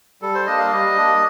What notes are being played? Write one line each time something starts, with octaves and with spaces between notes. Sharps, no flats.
G3 A4
C5
A#3 D4 D#5
F5
G3 D#5
A#3 D4